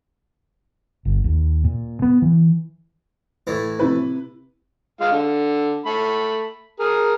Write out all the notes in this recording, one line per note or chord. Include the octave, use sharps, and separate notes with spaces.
G1
D#2
A#2
B3
E3
A2 E3
C3 E4 B4
G#3 F4 F5
D3
A3 B5
G#4 A#4